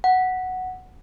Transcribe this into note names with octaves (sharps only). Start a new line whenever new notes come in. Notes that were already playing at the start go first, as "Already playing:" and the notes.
F#5